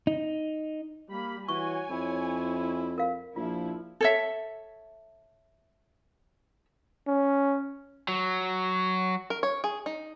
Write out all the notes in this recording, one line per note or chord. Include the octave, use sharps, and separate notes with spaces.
D#4
G3 A#3 B5
E3 F#4 C#5 G#5 C#6
F2 E4
A#4 F5
A#1 F3 E4 F4
A4 C#5 E5
C#4
F#3
A#4
C#5
G#4
D#4